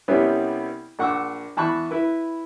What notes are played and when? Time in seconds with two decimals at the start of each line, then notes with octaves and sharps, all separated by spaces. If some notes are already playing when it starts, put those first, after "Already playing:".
0.08 C2 C3 G3 B3 C#4 B4
0.99 A#1 F#5 C#6 D6 E6
1.57 E2 A5 B5 C#6 F#6
1.91 E4 B4